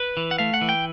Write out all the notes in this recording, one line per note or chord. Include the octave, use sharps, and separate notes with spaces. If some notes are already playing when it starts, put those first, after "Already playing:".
Already playing: B4
E3
F#5
A3 F5
F#5
E3
G5